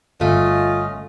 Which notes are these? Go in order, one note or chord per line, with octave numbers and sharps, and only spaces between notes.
G1 A3 C#4 F4 D#5